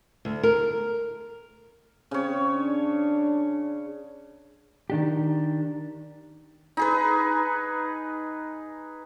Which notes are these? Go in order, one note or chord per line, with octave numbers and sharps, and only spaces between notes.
D2
A#4
C#3 C4 C#5
D4
D#3 D4 G4
D#4 G#4 B4